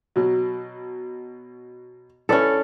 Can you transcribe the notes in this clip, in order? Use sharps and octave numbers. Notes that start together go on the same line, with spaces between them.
B2 F#3
C#4 E4 A4 B4 D5